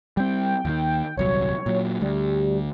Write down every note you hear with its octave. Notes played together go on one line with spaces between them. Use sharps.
G3 C4 G5
D#2 D#3
D#1 C2 F#3 C#5
A#2 F#3
D2 G3